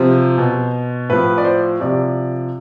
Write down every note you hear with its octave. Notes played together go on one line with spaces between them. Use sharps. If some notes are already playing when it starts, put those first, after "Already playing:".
Already playing: C3 F3 C5
B2
A2 F3 B4
D5
C5
C3 F3 D5